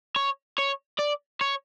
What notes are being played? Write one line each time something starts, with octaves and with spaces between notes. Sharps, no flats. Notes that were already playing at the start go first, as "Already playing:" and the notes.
C#5
C#5
D5
C#5